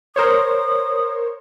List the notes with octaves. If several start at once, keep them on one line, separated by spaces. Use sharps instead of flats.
A#4 C5 C#5 D#6